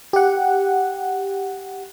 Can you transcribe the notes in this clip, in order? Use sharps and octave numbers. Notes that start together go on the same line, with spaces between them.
G4 F#5